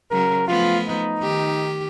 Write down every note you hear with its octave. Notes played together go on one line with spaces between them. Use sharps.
C#3 F#3 A#4
F3 A3 B3 F4
D#4
D#3 G4